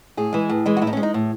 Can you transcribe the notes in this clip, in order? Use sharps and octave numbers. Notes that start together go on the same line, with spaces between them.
A2 G#4
E3 G#3
A2
E3 G#3
F#4
A2 E4
D#4
C#4
G#3
D#4
A2